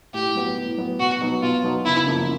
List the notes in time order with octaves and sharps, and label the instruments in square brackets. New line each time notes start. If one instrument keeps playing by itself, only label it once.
[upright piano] A2 [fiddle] G4
[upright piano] F#3 B3
A2
F#3 B3
[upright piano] B2 [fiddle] F#4
[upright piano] F#3 B3 D#4
[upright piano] B2 [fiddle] F4
[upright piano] F#3 B3 D#4
[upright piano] F#1 [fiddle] E4
[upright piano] F#2 C#3 F3 A#3